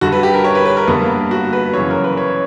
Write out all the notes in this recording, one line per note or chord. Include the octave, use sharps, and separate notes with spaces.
G2 D3 F#4
B4
G4
A#4
C#5
B4
B4
A#4
G2 D3 B3
A#3
F#4
B4
F#2 C#3 E3 C#5
A#4
B4
C#5